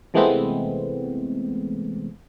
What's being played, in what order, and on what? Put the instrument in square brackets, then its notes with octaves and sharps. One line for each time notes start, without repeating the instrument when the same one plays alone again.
[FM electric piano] C3 E3 G#3 A3 B3 C4